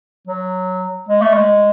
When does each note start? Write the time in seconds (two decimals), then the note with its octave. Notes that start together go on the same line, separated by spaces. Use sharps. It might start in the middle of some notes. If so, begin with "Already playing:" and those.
0.27 F#3
1.09 G#3
1.21 A3
1.33 G#3